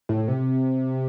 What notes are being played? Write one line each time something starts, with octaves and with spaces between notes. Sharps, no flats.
A2
C3